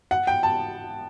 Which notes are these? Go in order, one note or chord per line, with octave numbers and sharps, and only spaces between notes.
F#5
G5
A5